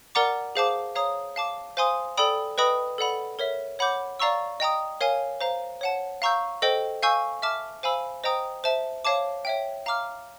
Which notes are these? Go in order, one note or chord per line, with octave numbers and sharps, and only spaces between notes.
A#4 D5 F#5 A#5 D6
G#4 C5 F5 A5 D6
C#5 F5 A#5 D#6
F5 A5 D6
C5 F5 G#5 C6 D#6
A4 D5 G5 B5 D#6
B4 D#5 G5 B5 D#6
A4 D5 F#5 B5
A#4 C#5 E5
C#5 F#5 B5 D6 G6
D5 F5 A#5 C#6 E6
D#5 G5 A#5 D#6
A#4 C#5 F5 G#5
C5 F5 A#5
C#5 F#5 A5
F5 A#5 C#6 E6 G6
A4 C5 D#5 G5
F5 G#5 C#6 E6 G6
E5 A5 D6 F6
C5 F5 G#5 B5 E6
C5 D#5 G5 A#5 D#6
C5 E5 A5
C#5 F5 A5 D6
C#5 E5 G5
F5 A#5 D6 F6